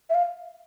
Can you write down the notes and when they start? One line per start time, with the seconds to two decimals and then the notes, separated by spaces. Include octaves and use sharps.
0.10 E5
0.14 F5